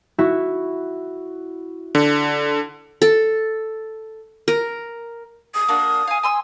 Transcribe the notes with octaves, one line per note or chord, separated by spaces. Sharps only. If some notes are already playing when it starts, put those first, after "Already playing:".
E4 F#4
D3
A4
A#4
D#6
A#3 D4 F#4
F5 G#5
G#5 C6 E6